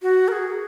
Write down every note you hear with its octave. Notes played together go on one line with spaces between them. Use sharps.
F#4
A#4
G#4